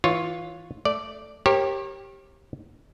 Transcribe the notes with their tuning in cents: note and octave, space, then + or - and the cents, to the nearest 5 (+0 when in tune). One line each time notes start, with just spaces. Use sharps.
E3 -20 F4 +10 C#5 +0
A3 +0 D5 +0
G4 +0 A#4 -10 C#5 -40